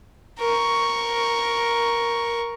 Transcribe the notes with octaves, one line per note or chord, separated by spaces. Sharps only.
A#4 C#6